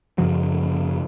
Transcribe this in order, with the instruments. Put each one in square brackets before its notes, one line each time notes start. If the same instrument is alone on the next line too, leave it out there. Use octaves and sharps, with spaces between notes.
[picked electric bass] F#2 C#3 F3 F#3